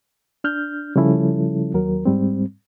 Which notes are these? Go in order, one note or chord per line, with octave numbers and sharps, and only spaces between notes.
D4 F6 G6
C#3 F3 G3 C#4 E4 A4
D#2 F#3 A#4
G#2 G3 C4